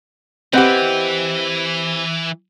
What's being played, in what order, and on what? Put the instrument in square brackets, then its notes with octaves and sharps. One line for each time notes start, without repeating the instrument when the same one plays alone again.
[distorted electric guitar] E3 [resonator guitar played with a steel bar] C4 G4 [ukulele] B4 D#5 F#5